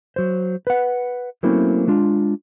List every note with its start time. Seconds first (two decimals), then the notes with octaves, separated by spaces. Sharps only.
0.16 F#3 C5
0.67 B4 F#5
1.43 F#3 A3 A#3 C4 C#4 E4
1.88 G#3 D4 F4